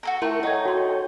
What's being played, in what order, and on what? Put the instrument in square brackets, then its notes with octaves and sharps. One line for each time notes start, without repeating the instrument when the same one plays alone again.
[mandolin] F#4 A4 A#4
[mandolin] A3 C#6 [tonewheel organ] E4 A#4 [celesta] G5 C6
[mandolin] D#4 [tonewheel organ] A4 C#5 G5 [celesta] F#5 C#6 G#6
[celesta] F#4 C6